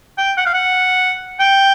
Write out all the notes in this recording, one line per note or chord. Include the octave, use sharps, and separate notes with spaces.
G5
F#5
F5
F#5
G5